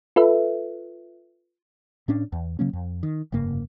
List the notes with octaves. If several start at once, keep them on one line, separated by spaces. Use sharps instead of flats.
F4 A4 B4 E5
A2 C#4 D4
E2
C#3 F#3 A#3 C#4
F2
D#3
F1 G2 C#3 A#3